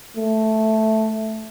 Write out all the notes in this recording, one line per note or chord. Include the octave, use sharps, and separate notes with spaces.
A3